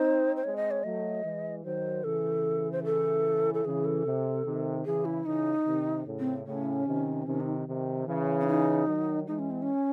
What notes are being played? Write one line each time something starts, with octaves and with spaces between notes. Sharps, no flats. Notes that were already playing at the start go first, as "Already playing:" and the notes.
Already playing: C4 D#4 C5
C5
G#3 C4 C#5
D#5
C#5
F#3 A3 D#5
E3 G#3
D#3 F#3 C5
C#3 E3 A4
C5
A4
A4
C#3 E3 G#4
A4
C3
C3 D#3
C#3 E3 G#4
E4
C#3 E3 D#4
C3 D#3
A2 C#3
C4
A2 C#3 C#4
C3 D#3
C4
C3 D#3 C#4
D#4
C3 D#3
C#3 E3
C#4
D#4
D#3 F#3
E3 G#3 D#4
C#4
C4
C#4